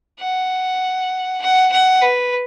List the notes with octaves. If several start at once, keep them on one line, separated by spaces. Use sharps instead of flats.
F#5
F#5
F#5
B4